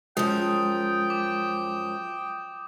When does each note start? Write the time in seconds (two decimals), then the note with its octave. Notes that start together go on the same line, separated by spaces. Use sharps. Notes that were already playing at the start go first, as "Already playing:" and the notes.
0.17 F#2 F3 G#3 G5 D#6
1.10 D6